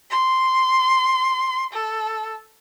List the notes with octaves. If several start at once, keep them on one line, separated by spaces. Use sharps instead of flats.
C6
A4